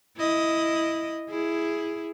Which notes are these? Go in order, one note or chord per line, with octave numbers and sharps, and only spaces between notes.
E4 D#5
E4 G#4